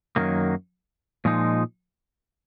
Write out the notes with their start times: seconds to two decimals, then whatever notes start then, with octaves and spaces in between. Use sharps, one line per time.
0.16 F#2 D#3 F#3 A#3
1.25 A#2 F3 G#3 D#4